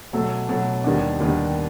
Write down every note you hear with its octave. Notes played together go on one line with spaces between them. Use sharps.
B2 F#3 A3
B2 F#3 A3
D#2 D#3 G3 B3 D4
D#2 D#3 G3 B3 D4